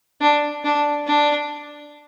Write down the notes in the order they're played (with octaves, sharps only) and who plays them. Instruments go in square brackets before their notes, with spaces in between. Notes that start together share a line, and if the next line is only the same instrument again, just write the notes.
[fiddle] D4
D4
D4